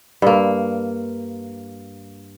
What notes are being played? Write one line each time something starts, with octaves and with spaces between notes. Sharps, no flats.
G2 A#3